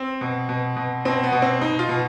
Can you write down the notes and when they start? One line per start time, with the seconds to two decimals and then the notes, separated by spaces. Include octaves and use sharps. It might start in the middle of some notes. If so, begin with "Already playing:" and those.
Already playing: C4
0.21 B2
0.49 B2
0.77 B2
1.05 B2 C4
1.23 B3
1.32 B2
1.42 C4
1.61 B2 D#4
1.79 F4
1.89 B2